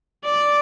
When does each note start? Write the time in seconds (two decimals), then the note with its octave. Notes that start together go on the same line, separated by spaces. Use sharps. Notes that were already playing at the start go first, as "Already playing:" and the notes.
0.25 D5